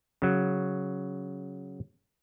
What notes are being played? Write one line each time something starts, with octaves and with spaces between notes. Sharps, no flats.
C#3 F#3